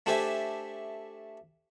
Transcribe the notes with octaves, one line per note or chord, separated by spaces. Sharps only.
A3 D4 G4 C5 E5 G#5